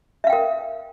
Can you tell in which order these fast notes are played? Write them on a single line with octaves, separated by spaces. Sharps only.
E5 F5 G5 A#4